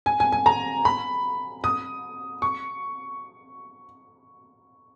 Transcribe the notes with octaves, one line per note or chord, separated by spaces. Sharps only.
G#5
G#5
G#5
A#5
B5
D#6
C#6